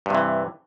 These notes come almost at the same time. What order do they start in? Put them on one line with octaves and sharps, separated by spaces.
G2 C3 E3